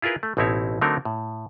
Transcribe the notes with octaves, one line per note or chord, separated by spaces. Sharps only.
E4 F4 G#4 A#4 B4
A3
A1 B2 C4 D#4 E4 C#5
D3 F#3 A3 C4 D#4 A#4
A2